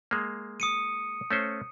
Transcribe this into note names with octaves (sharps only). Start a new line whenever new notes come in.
G#3 A#3
D#6 C#7 D#7
A3 C#4 C5